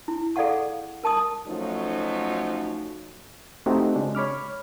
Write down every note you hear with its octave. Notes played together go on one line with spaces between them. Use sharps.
E4
G#4 A4 D5 F5 F#5 C#6
A#4 A5 C#6 D#6
F3 F#3 A3 C#4 D#4
A3 C4 D#4 F#4 G4
C#3 G#3 D4
C#5 B5 D6 F6